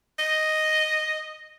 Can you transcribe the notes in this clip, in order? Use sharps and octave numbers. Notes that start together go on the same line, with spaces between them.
D#5